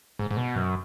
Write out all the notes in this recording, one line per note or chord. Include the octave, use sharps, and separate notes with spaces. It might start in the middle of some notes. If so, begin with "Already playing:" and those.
G#2
G#2
B2
F#2